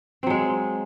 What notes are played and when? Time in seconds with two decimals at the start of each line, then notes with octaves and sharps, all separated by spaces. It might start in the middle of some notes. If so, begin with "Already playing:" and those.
0.23 C4
0.27 F#3
0.30 G#3